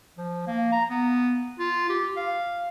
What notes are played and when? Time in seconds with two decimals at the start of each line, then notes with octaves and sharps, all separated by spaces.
0.18 F3
0.47 A#3
0.72 A#5
0.90 B3
1.59 F4
1.89 G4
2.16 F5